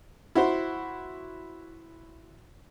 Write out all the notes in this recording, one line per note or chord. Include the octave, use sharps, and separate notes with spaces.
E4 F#4 C5